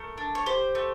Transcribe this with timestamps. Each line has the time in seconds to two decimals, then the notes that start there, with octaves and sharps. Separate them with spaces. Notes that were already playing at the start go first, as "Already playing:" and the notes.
Already playing: A3 A#4
0.18 D4
0.35 C#5
0.46 G4 C5
0.75 A3